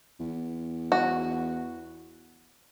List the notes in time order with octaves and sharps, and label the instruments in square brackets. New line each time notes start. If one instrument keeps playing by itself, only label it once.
[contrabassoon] E2
[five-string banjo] F#4